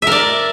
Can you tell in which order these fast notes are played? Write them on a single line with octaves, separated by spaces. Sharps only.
E5 A#4 D5